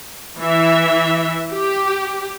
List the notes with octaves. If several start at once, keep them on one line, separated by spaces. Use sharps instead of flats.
E3 E5
G4